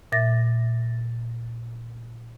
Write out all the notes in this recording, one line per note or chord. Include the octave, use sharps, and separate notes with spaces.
A#2 E5 A6 A#6